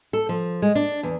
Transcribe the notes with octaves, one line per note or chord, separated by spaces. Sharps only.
A4
F3
G#3
D4
E2